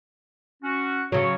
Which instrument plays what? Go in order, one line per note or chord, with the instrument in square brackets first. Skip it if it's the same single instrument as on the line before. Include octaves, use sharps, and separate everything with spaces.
[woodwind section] C#4 F#4
[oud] C#3 F#3 [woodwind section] C#5